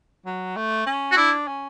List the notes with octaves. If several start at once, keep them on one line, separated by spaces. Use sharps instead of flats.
F#3
A3
C#4
F#4
D4 E4
C#4